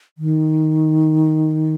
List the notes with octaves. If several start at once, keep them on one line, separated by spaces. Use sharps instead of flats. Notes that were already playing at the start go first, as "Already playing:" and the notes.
D#3